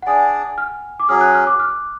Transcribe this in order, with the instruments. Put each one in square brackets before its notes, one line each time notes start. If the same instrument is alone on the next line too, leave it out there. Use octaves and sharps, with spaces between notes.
[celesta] F#5
[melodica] D4 G#4 D5 [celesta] G#5
[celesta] F6
D6
[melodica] F#3 C#4 G#4 [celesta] F6
[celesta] F#6
F6
D6
F6